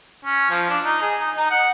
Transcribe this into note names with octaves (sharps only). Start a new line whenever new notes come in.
C#4
F3
D4
D#4
G#4
D#4
D#4
F#5